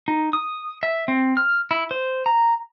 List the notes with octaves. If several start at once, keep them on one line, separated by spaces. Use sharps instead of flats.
D#4
D#6
E5
C4
F6
E4
C5
A#5